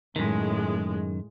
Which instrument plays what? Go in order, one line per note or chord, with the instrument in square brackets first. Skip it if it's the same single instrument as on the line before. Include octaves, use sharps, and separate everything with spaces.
[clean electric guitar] F#2 D#3 [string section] A2 G#3